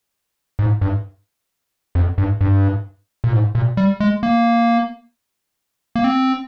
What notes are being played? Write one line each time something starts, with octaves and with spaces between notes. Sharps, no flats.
G#2
G2
F2
G2
G2
A#2
G#2
A#2
G3
G#3
A#3
A#3
C4